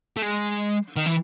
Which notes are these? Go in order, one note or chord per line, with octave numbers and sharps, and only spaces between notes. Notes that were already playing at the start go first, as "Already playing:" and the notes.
A3
G#3
D#3
E3